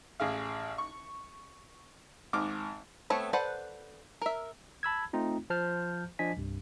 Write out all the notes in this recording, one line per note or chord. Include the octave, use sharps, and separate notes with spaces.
A1 G#4 F5
C#6
G#1 G#2 D6 F6
A3 B3 C4 A4 C#5
A4 B4 C5 D5 F#5
A#4 E5
A5 B5 E6 G#6
A3 C4 D#4 F4
F3 C5 A5 F6 G6
F3 D4 D#5 G#5 B6
C2 G2